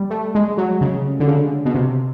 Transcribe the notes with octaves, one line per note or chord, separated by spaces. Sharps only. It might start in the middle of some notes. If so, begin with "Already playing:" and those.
Already playing: G3
A3
G#3
F#3
C#3
D3
C#3
B2
C3